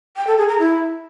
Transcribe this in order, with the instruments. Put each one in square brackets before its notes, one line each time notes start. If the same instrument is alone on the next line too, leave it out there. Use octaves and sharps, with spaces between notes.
[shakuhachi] G5
A4
G#4
A#5
E4